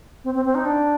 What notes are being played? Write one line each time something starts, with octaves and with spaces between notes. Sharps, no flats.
C4
C4
C4
D#4
D4